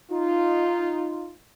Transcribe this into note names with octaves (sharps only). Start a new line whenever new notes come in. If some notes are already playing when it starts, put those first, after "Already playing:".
D#4 F4